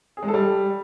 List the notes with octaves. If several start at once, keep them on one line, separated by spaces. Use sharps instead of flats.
G#4
G#3
A4
G3